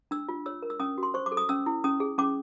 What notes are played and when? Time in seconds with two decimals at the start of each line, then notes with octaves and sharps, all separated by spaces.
0.11 D4 E6
0.29 F4
0.46 C#5 E6
0.62 A#4
0.70 E6
0.80 C#4 D#6
0.98 F#4
1.03 C6
1.14 C5 C#6
1.26 D6
1.32 A4
1.37 D#6
1.49 C#4 E6
1.66 E4
1.84 C#4 D#6
2.00 G#4
2.18 C#4 D6